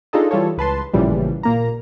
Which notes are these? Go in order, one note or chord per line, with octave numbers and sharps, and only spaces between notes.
D4 D#4 F4 G#4 A4 D#5
E3 G3 F4 A4 C#5
C#2 B4 A5 C6
A1 A#2 C#3 E3 F3 G3
A#2 A#3 A#5